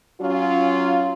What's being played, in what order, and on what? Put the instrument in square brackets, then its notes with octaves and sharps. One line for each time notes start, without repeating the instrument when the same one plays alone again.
[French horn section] F#3 C#4 F4